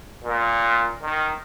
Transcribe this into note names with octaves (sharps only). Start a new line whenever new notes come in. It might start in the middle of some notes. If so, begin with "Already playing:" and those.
A#2
D#3